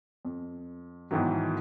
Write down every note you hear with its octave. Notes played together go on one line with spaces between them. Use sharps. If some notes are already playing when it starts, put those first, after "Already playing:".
F2
G#2 B2 D#3 E3 F#3